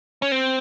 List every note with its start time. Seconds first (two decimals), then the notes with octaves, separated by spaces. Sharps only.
0.22 C#4
0.32 C4